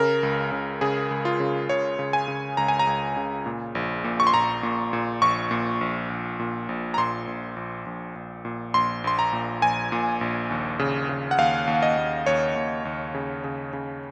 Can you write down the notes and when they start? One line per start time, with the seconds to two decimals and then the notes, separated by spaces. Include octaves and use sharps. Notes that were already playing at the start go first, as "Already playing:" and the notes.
Already playing: C#3 A#4
0.23 C#2
0.52 C#3
0.81 C#3 G#4
1.11 C#2
1.25 F4
1.40 C#3
1.69 C#3 C#5
1.99 C#3
2.13 G#5
2.28 C#3
2.57 C#2 A#5
2.68 G#5
2.79 A#5
2.87 C#2
3.17 C#3
3.46 A#2
3.75 A#1
4.04 A#2
4.20 C#6
4.27 C6
4.34 A#1 A#5
4.63 A#2
4.93 A#2
5.22 A#1 C#6
5.51 A#2
5.81 A#1
6.10 A#1
6.39 A#2
6.69 A#1
6.94 A#5
6.98 A#2 C6
7.27 A#1
7.56 A#1
7.86 A#1
8.16 A#1
8.45 A#2
8.74 A#1 C6
9.04 A#1 C6
9.19 A#5
9.33 A#2
9.62 A#1 G#5
9.92 A#2
10.21 A#1
10.51 D#2
10.79 C#3
11.09 C#3
11.31 F#5
11.38 D#2 F5
11.67 D#2
11.82 D#5
11.97 D#2
12.26 D#2 C#5
12.56 D#2
12.85 D#2
13.15 C#3
13.44 C#3
13.73 C#3